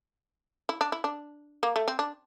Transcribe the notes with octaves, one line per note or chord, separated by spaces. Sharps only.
E4
D4
E4
D4
A#3
A3
C4
D4